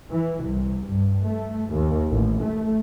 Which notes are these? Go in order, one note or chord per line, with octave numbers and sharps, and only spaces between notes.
E3
C2
G2
A3
D#2
A1
A3